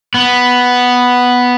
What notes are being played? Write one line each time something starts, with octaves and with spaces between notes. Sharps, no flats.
B3